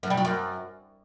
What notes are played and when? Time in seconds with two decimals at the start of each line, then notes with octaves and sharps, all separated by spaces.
0.03 F#2
0.10 G3
0.17 F#3
0.25 F#2